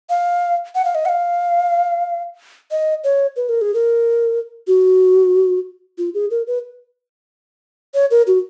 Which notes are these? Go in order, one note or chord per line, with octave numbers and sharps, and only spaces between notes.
F5
F#5
F5
D#5
F#5
F5
D#5
C#5
B4
A#4
G#4
A#4
F#4
F4
G#4
A#4
B4
C#5
A#4
F#4